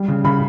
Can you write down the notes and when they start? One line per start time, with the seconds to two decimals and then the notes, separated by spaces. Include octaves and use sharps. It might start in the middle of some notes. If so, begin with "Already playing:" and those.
Already playing: G3
0.08 C#3
0.24 C#3 B5